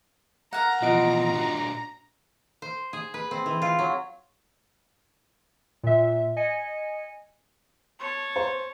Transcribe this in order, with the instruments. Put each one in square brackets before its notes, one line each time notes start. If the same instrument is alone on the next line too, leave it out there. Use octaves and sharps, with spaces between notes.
[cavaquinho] A#4 F5 F#5 [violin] A#5
[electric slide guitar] B2 E3 F3 [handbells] F4 D#5 D7 [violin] A#5
[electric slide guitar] A#2 D4 F#4
[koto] C5
G#4
B4
C4
E3
F4
F#3
[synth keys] A#2 E5
D#5 G#5 C#7
[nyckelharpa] C#5 A5
[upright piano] C5